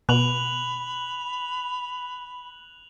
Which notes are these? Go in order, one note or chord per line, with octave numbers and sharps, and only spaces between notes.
B2 B5 F#6 F7 F#7